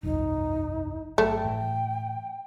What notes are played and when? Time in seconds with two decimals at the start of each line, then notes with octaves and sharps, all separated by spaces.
0.03 G1 C2 F2 D#4
1.18 G1 F#3 A3 G5
1.45 A2 E3